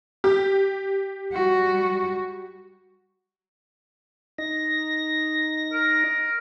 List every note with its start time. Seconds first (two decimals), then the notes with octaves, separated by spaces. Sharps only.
0.24 G4
1.33 G3 F#4
4.38 D#4 A#6
5.72 A#4